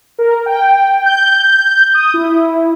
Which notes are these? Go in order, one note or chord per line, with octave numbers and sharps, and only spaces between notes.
A#4
G5
G6
D#6
E4